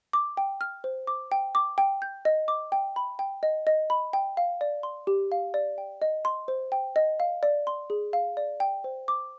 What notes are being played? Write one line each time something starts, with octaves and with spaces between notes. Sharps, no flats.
D6
G5
F6
C5
D6
G5
D6
G5
G6
D#5
D6
G5
B5
G5
D#5
D#5
B5
G5
F5
D5
C6
G4
F5
D5
G5
D#5
C6
C5
G5
D#5
F5
D5
C6
G#4
F5
D5
G5
C5
D6